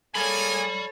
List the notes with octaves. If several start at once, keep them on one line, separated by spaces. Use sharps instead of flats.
A#3 G#4 A4 C#5 D5 G#5 B5